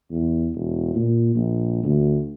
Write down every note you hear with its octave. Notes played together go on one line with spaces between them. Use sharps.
E2
E1
A#2
A#1
D2